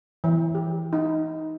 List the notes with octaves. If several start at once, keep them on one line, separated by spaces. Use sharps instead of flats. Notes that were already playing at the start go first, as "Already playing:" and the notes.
E3
G4
D#4